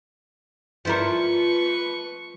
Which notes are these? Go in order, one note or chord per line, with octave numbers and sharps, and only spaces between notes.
F3 E4 A#4 B4 C#6